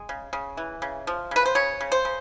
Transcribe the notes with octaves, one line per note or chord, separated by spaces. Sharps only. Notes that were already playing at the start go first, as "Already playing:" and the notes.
Already playing: G#3
C#3
C#3
E3
C#3
F3
C#3 B4
C5
C#3 C#5
C#3
C5
C#3